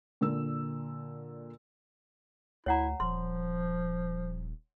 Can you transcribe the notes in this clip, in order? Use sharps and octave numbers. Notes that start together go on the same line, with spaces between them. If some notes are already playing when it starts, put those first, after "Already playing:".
A#2 D3 A#4 E6
D2 E4 C#5 F#5 A#5
D#1 F3 C6